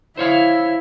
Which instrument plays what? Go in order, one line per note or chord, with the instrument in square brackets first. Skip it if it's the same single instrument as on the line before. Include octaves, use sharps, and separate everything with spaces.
[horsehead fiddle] E4 [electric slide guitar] C5 C#5 F5